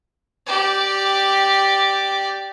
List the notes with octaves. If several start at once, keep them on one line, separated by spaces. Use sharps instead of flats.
G4 D5